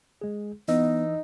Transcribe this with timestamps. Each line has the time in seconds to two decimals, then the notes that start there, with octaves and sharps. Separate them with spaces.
0.21 G#3 G#4
0.68 E3 B3 D#4 D#5 E6